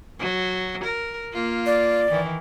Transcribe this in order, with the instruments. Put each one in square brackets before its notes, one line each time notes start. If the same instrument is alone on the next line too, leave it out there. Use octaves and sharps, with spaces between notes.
[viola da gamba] F#3
A#4
A#3 F4
[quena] D5
[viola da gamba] D#3 E3